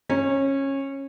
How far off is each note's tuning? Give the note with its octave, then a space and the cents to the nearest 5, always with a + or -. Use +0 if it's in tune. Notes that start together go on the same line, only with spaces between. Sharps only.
C#4 -20